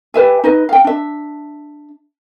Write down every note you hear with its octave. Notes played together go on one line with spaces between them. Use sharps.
G4 B4 E5 G#5
D#4 B4 D#5
F5 G5
D4 E5